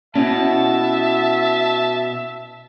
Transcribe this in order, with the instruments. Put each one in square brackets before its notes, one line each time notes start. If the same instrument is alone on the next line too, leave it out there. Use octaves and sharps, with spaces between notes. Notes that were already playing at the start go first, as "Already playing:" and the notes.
[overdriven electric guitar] B2 [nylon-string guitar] C#4 E4 [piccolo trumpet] E5 [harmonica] A5